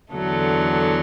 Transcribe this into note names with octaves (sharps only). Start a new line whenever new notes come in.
E2 D3 F#3 A3